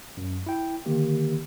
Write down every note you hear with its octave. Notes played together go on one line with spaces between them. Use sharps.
F#2
E4 G5
D3 D#3 A#3 G4